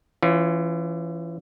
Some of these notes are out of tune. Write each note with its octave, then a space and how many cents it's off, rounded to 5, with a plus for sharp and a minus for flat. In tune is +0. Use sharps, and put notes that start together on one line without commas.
E3 +25 C#4 +0 F4 +10